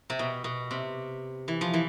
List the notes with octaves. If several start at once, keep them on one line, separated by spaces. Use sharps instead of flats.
C3
B2
B2
C3
E3
F3
E3